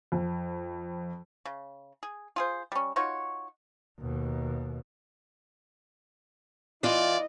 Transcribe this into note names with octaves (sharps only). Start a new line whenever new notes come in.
F2
C#3
G#4
F4 G#4 C5
G3 C#4
D#4 F4 F#4 C#5
D#2 B2
E3 E4 F4 D5 D#5